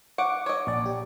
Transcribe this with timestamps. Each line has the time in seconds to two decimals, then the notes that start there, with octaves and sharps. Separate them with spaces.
0.18 F#5 C#6 D6
0.46 C#5 D#5
0.67 A#1 D5
0.86 G4